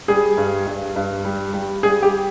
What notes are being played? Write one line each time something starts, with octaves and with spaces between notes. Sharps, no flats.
G3 G#4
G2
G2
G2
G3
G3
G3 G#4
G4